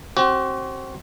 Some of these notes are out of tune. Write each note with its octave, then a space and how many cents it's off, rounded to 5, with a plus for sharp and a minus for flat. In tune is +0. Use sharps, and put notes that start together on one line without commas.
C4 +25 F#4 +40